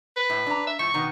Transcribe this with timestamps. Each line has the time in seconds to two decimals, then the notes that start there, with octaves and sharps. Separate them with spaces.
0.17 B4
0.30 A2
0.46 D4 A#5
0.67 E5
0.79 A2 F3 C#6
0.94 B2 D#3 B3